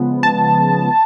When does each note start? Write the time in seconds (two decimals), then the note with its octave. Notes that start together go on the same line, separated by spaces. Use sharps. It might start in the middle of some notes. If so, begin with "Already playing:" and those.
Already playing: C#3 F3 G#3 B3
0.23 A5